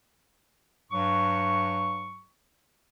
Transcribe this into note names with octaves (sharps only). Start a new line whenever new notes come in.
G2 F#3 C#6